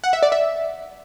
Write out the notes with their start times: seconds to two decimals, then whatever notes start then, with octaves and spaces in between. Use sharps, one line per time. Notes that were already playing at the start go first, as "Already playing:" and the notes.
0.04 F#5
0.13 E5
0.23 D5
0.32 E5